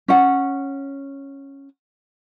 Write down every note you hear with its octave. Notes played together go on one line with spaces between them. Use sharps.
C#4 F#5